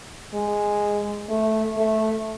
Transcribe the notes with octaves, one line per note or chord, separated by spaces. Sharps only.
G#3
A3
A3